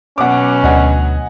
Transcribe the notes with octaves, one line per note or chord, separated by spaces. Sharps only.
B2 F#3 C#4 F#5 D6
D2 D4 D#5 F#5 G#5